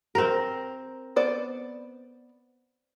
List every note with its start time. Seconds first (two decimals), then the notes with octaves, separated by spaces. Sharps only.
0.15 C4 A#4
1.16 B3 C5 D5